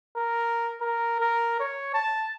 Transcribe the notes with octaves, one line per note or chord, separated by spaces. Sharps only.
A#4
A#4
A#4
C#5
A5